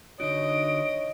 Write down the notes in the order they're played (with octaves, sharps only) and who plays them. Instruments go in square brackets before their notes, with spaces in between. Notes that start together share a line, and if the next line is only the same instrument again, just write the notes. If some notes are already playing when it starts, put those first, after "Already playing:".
[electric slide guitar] D3 D#4 F#4 [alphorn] C#5 [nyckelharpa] D#5 [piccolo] D7